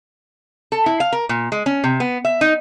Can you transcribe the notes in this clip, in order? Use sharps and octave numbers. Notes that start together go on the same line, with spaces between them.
A4
E4
F5
A#4
A#2
G#3
C#4
C3
B3
E5
D#4